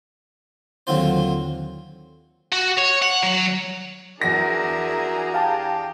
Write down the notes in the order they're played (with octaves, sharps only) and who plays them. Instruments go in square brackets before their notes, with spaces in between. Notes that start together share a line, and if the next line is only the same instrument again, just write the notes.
[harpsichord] D#2 D3 F#3 C4 F4 C5
[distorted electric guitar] F#4
C#5
F#5
F#3
[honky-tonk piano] E2 A#6 [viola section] D4 G#4 A#5 [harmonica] F#4 A#4 E5
[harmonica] G4 [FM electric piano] F5 G5 A5